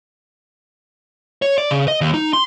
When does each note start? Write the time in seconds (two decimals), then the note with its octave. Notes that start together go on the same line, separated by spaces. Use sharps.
1.42 C#5
1.58 D5
1.71 C#3
1.88 D#5
2.01 D#2
2.14 D#4
2.33 C6